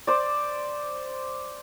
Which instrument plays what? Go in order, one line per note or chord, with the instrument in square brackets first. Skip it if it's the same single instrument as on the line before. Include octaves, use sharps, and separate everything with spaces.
[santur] C5 D5